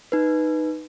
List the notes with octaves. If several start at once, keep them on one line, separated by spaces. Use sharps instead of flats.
D#4 B4